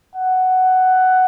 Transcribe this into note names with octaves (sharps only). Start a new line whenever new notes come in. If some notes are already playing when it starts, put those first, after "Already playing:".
F#5